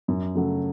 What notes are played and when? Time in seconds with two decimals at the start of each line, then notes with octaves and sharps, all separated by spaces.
0.08 F#2
0.35 C#3 F#3 A3